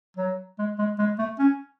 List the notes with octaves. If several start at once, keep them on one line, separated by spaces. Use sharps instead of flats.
F#3
G#3
G#3
G#3
A3
C#4